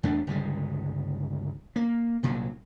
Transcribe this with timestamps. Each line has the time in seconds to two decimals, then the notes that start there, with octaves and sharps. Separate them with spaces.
0.03 E2 A3 D4
0.27 G1 C#2 G3 G#3
1.76 A#3
2.23 C2 A#2 F#3